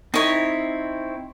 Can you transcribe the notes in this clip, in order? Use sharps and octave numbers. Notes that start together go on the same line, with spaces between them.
C4 D#4 E4 C#5